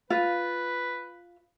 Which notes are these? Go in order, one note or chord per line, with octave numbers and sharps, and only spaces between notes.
F4 B4